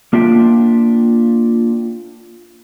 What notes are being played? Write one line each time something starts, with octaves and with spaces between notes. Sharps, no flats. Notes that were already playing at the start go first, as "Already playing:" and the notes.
A#3 D4 F4 E5 G5